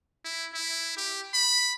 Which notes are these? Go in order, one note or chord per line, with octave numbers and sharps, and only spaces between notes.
E4
E4
G4
B5